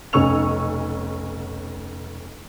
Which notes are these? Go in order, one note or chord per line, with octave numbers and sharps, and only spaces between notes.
F1 B1 C#4 C#6 E6 F7